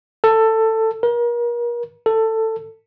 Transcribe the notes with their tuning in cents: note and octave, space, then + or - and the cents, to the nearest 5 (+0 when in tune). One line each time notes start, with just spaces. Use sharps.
A4 +15
A#4 +35
A4 +15